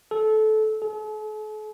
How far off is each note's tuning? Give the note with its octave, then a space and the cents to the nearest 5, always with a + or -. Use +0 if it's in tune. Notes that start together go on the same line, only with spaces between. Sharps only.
A4 -20
A4 -45